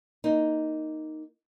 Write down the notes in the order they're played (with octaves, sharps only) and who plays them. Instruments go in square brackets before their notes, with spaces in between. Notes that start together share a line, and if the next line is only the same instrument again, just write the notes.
[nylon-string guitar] A#3 D#4